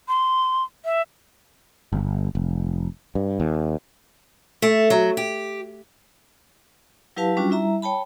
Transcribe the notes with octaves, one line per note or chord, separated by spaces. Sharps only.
C6
E5
G1
F1
G2
D#2
A3
F#3
G4
F#3 E4 G4 B4 F5 A5
G3 C#4 D4 F4 F#4
G3 E4 E5 A#5
C#5 G5 A5 B5